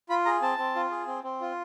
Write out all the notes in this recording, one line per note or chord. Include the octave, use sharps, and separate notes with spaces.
F4 B5
G#4 A#5
C4 A5
C4
F4
G#4
C4
C4
F4